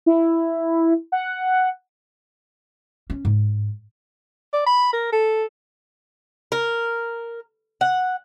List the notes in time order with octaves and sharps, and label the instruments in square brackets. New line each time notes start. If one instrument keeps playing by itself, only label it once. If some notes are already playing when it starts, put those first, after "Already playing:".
[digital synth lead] E4
F#5
[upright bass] C#4
G#2
[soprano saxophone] D5
B5
A#4
A4
[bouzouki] A#4
F#5